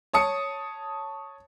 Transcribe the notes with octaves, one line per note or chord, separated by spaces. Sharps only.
C#5 A5 D#6 C#7